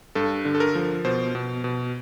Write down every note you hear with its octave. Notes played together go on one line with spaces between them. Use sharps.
G2 A4
D3
A4
A#4
F3
B2 C5
B2
B2